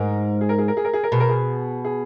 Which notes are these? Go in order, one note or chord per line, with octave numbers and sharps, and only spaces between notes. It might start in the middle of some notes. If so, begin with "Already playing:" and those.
Already playing: G#2 A#4
G#4
A#4
G#4
A#4
G#4
A#4
G#4
A#4
B2 G#4
A#4
G#4
G#4